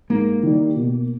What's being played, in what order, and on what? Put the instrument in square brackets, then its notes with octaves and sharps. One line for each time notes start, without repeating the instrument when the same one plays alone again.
[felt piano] G#2 [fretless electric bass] A#3
[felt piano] D#3 G3
B2